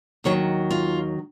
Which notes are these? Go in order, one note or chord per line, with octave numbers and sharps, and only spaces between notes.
D#2 D#3 F#3 C#5
F4